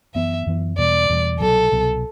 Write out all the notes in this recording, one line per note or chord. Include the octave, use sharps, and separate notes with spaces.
F#2 E3 B3 E5
F#2 E3 B3
E2 B2 G3 D5
E2 B2 G3
C2 B2 F#3 A4
C2 B2 F#3